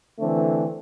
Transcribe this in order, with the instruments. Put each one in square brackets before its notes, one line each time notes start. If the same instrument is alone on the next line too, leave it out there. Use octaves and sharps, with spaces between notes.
[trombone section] D3 E3 A3 C4